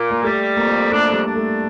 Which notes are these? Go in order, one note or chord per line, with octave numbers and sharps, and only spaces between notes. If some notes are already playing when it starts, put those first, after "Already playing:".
Already playing: A#2
A#3
G3 A3
F2 A#3
A3 D4
G3
D4
A3